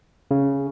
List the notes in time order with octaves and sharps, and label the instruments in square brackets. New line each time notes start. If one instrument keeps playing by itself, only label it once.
[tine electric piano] C#3